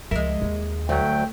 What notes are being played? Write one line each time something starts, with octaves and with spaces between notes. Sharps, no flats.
C#2 F3 G#3 A#4 E5
D#2
D2 F#3 A3 G5